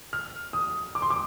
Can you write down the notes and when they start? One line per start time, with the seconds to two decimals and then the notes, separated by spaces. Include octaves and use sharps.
0.13 F6
0.53 D#6
0.95 D6
1.02 C6
1.10 D6